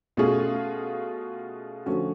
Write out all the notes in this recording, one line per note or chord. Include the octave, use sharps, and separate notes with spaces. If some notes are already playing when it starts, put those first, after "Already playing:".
B2 A3 C#4 F4 G#4
D3 F3 A3 C#4 F#4